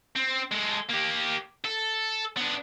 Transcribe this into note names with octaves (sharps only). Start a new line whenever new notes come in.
C4
G#3 A4
A#3 G4
A4
B3 D4